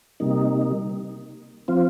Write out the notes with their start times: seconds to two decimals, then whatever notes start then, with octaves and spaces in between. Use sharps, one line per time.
0.20 C3 G3 A#3 D#4
1.68 F3 C4 F4